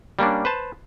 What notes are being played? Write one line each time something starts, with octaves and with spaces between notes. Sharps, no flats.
G3 A#3 C#4 D4
B4 C5 A5